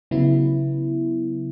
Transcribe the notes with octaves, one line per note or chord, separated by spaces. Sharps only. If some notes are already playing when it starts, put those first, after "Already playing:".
C#3 F#3 B3 E4